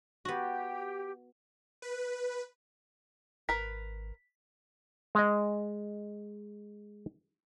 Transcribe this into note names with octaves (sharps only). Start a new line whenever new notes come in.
B3 F#4 G4
B4
G#1 A#4 B4 B6
G#3 D#5